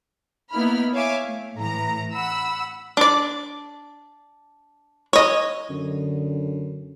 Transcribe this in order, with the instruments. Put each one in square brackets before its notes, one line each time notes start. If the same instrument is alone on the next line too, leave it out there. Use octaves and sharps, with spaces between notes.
[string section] A#3 B3 D#4 E4 B5 F6
C#5 E5 F5 G#5 D6
A3
A2 E3 A#5
F#5 B5 E6
[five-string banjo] D4 D5
C#5 D#5
[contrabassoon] F#2 [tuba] D3